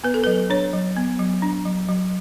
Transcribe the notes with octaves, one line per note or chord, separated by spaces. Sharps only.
B3 B4
A4
F#3 B4
D4 C#5
F#3
B3
F#3
D4
F#3
F#3